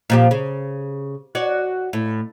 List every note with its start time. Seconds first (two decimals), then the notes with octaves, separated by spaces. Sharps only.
0.10 A#2 F3 G4
0.31 C#3
1.35 F#4 C#5 D5
1.93 A2